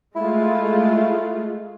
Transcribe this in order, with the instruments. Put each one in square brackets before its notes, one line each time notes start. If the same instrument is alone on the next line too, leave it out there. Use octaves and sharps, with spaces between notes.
[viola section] G#3 A3 F4 [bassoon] E4